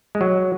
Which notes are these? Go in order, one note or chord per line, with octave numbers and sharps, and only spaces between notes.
G#3
F#3